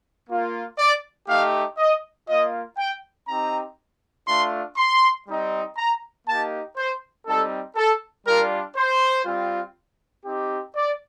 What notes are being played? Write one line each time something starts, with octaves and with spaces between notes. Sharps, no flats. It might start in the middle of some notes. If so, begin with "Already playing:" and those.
A#3 F4
D5
A3 D#4 G4 F5
D#5
A#3 F4 D#5
G5
C4 D#4 G4 A#5
A3 D4 F4 C6
C6
G3 C4 D#4
A#5
A#3 D#4 G4 A5
C5
G3 C4 D#4 A4
A4
G3 D4 F4 A#4
C5
G3 C4 F4
C4 D#4 G4
D5